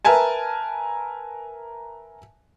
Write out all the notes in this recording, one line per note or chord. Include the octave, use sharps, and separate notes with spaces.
A#4 B4 E5 G#5 A5